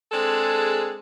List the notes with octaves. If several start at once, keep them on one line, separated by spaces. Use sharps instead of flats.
G#3 C4 D4 G#4 A4